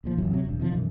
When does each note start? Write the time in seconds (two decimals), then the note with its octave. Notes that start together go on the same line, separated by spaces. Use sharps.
0.04 D1 A#2 F3
0.18 D1 F#2 E3 F#3
0.31 C3 F#3
0.45 E1 G2
0.60 C3 D#3 F3
0.72 B1 F#2 E3